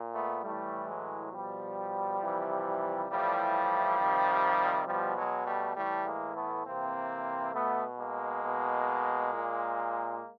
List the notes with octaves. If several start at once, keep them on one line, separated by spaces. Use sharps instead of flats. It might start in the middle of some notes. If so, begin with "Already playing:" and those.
Already playing: A#2
A3 B3
A2 E3 G3 A3
F#3 G#3
B2 F3 G3
C3 E3
A2 E3 F3 G3
C3 D#3
B2 F3 G3
F#3 G#3
G3 A3
A2 E3 G3 A3
G#3 A#3
A3 B3
C3 E3 A#3 C4
B2 A3 B3
G#3 A#3
B2
A#2